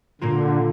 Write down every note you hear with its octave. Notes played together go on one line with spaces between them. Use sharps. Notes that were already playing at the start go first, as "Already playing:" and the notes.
A#2 D3 A#3 F4